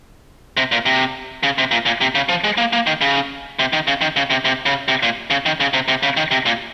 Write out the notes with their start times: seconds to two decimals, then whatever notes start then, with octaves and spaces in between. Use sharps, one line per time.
0.57 C3
0.72 A#2
0.86 C3
1.43 C#3
1.58 C3
1.71 A#2
1.86 A#2
2.01 C3
2.15 C#3
2.29 F3
2.44 G#3
2.58 A#3
2.73 A#3
2.87 D#3
3.01 C#3
3.59 C3
3.73 D#3
3.87 C#3
4.01 D#3
4.16 C#3
4.30 C3
4.45 C3
4.66 C#3
4.88 C3
5.03 A#2
5.30 C#3
5.46 D#3
5.60 C#3
5.73 C3
5.88 C3
6.03 C#3
6.17 D#3
6.31 C3
6.46 A#2